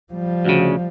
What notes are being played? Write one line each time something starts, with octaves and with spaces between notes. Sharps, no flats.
F3 G3
D2 C#3 F#4